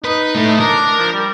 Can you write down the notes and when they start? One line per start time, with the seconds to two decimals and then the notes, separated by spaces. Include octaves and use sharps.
0.04 D#4 B4
0.35 A3 E4
0.61 D4 A#4
0.98 F3
1.13 G3